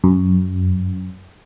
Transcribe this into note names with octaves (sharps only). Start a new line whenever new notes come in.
F#2